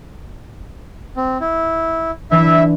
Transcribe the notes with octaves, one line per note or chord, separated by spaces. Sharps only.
C4
E4
E3 D4 E4 E5